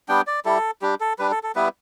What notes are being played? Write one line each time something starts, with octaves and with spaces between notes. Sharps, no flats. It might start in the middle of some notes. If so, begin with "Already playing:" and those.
G3 B3 D4 G5
D5
G3 E4 A4
G3 D4 G4
A4
G3 D4 B4
A4
A4
G3 B3 E4 B4